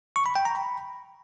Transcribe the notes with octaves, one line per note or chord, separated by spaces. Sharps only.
C#6
B5
G5
A#5
B5